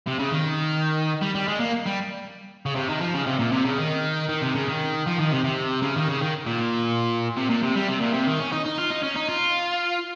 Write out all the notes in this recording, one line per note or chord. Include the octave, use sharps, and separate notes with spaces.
C3
C#3
D#3
G3
G3
G#3
A#3
G3
C#3
C3
D#3
F3
C#3
C3
A#2
C3
C#3
D#3
D#3
C3
C#3
D#3
F3
D#3
C3
C3
C#3
D#3
C#3
D#3
A#2
C3
A#2
C3
G3
C3
A#2
C3
D#3
C#4
D#4
D#4
F4
D#4
C#4
D#4
F4